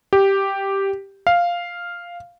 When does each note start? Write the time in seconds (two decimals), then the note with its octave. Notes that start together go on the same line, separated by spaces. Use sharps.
0.13 G4
1.27 F5